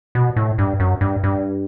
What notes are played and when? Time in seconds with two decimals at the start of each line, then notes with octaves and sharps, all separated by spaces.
0.15 B2
0.36 A2
0.58 G2
0.80 F#2
1.01 G2
1.24 G2